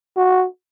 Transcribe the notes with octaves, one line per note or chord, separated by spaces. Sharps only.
F#4